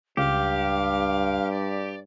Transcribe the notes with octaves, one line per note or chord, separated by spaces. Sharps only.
C#2 G2 G4 F5
D5